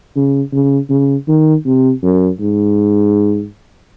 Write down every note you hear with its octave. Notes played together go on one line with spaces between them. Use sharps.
C#3
C#3
C#3
D#3
C3
F#2
G#2